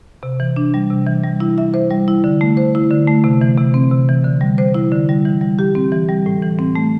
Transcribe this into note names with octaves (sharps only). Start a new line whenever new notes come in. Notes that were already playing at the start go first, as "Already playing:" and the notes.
C3
E3
D4
G3
C3
E3
G3
E4
E5
C5
G3
E4
D3
A3
C5
E4
D3
A3
C3
E3
C3
C4
C3
E3
D3
G3
C5
E4
D3
G3
E3
G3
G4
C4
E3
G3
A2
E3
C4
A3